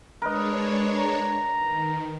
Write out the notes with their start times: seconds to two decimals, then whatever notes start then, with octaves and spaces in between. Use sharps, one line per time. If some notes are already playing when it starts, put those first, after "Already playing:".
0.22 G#3 D4 A#4 B4 C#5 D#5
0.97 A#5
1.58 D#3